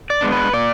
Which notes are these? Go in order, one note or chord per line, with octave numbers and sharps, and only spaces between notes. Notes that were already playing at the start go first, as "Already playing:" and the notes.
D5
G#3 B3 D4
B4
A#2 D5